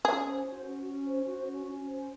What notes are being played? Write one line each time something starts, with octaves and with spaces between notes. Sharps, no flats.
C#4 G#4
C5
F#4
C#4
C#4
C5
F#4
C#4
C#4
C5